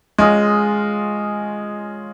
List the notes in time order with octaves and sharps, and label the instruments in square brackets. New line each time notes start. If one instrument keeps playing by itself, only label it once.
[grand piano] G#3 [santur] C#4 F4 G#4 D#5